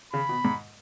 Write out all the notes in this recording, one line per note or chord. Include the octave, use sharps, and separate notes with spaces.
C#3 B5
B2
G#2